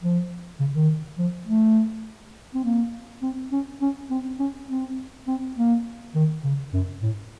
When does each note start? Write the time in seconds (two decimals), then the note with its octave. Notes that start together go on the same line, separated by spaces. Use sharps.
0.01 F3
0.60 C#3
0.74 D#3
1.18 F3
1.47 A3
2.54 C4
2.64 A#3
3.22 C4
3.52 C#4
3.81 C#4
4.10 C4
4.39 C#4
4.69 C4
5.27 C4
5.57 A#3
6.15 D#3
6.44 C#3
6.73 F#2
7.03 A2